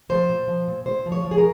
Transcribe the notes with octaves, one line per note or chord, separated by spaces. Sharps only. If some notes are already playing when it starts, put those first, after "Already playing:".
F3 C5
A#2
F3
A#2
A#2 C5
F3
C#5
F3
G#4
A#4